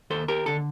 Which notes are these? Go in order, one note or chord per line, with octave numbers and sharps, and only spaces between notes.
D#2 A4 C5
D#2 G4 A#4
D3 A4